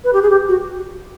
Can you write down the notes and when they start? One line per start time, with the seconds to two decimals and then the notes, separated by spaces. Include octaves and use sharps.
0.04 B4
0.13 G4
0.22 G#4
0.30 G4
0.49 F#4